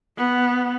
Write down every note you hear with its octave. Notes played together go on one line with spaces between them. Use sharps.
B3